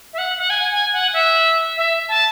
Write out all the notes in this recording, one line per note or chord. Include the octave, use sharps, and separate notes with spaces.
E5
F#5
F#5
G#5
G#5
F#5
E5
E5
A5